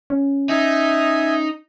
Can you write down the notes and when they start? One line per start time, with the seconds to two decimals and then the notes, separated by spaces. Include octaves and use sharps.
0.10 C#4
0.49 D#4 E5 G#5 D#6